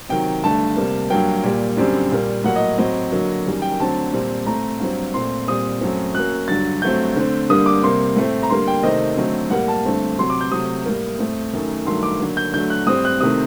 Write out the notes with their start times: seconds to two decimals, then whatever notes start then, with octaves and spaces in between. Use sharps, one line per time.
0.09 C3 D#3 F#3 G5
0.43 G2 D3 A3 A5
0.77 C3 G3 A#3
1.10 G2 F#3 A#3 G5
1.43 A#2 G3 A#3
1.77 F#2 D3 G3 C4
2.11 A#2 G3 A#3
2.44 A2 F#3 A#3 F#5
2.56 D#5
2.78 A2 F#3 C4 D#5
3.12 D3 F#3 A#3
3.46 F#2 D#3 G3
3.62 G5
3.80 D3 F#3 A3 C4 A5
4.13 A#2 G3 C4
4.46 A2 A3 C4 A#5
4.80 G2 F#3 C4
5.14 A#2 A3 C4 C6
5.48 A#2 G3 C4 D#6
5.81 F#2 F#3 A3 C4
6.15 F#2 F#3 A#3 F#6
6.48 G2 D3 F#3 A6
6.82 G2 F#3 A3 C4 G6
7.16 D3 A3 C4
7.49 G2 D3 G3 A#3 D#6
7.66 D6
7.83 C3 G3 A#3 C6
8.16 A2 A3 C4
8.43 A#5
8.50 D3 G3 A#3 C6
8.68 G5
8.83 C3 D#3 A3 C4 D#5
9.17 D3 F#3 A3 C4
9.51 A2 G3 A#3 F#5
9.68 A5
9.85 G2 D3 A3 C4
10.18 C3 F#3 C4 C6
10.30 D6
10.41 G6
10.51 C3 F#3 A3 D#6
10.86 A2 G3 A#3
11.19 A2 A3 C4
11.53 F#2 D#3 A3
11.86 G2 D#3 F#3 A3 C6
12.03 D6
12.20 D3 F#3 A#3
12.37 G6
12.54 D3 F#3 A3 G6
12.70 F#6
12.87 A2 G3 C4 D#6
13.05 F#6
13.20 C3 D#3 A3 C4 D#6